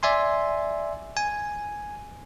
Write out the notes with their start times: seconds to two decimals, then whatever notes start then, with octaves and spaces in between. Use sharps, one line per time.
0.03 D5 E5 G#5 C6
1.17 G#5